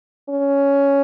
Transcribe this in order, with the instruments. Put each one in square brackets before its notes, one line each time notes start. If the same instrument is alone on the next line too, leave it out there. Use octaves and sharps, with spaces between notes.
[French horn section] C#4